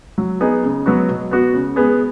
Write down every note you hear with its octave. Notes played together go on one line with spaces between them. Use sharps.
F#3
B3 D#4 G#4
C#3
F#3 B3 F#4
B2
B3 F#4
C#3
G#3 B3 G#4